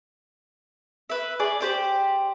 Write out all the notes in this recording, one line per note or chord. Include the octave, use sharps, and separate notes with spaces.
B4 E5
G#4 D5
G4 C5 D5